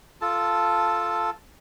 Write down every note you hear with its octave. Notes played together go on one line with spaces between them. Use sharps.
F4 A4 A5